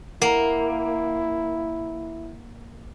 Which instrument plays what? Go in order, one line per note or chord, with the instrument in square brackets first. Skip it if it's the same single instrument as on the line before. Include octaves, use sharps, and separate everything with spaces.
[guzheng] A#3 [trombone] E4 [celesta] F#5 A#5